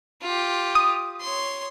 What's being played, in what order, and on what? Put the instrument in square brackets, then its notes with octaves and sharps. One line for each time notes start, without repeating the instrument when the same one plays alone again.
[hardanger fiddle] F4 G4
[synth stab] D#6
[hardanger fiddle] C#5 C6